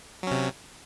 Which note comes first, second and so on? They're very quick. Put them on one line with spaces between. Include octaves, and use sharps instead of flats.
F#3 C#4 C3